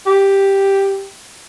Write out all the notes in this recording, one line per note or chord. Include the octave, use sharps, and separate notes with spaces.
G4